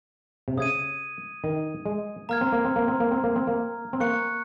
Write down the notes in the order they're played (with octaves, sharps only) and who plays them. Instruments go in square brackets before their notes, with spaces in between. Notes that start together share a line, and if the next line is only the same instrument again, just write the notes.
[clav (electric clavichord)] C3
[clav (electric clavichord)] C#3 [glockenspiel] D#6 G#6 D#7
[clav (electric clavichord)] D#3
G#3
[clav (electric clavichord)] A#3 [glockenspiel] A#5 F6 G#6
[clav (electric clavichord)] C4
A#3
C4
A#3
C4
A#3
C4
A#3
C4
A#3
C4
[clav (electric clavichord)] A#3 [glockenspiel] C#6 F#6 C#7